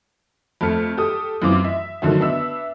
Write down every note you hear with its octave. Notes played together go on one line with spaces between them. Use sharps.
F2 A3 F6 C#7
G4 A4 D#6
F#2 E3 C4 F4 D6
E5
D3 D#3 F3 F#3 F#4
B3 D4 E5 E6